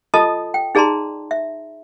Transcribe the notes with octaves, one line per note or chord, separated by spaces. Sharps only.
F4 A4 D#5 A5 D#6
G5
D#4 G#4 D5 A5 A#5 C6
E5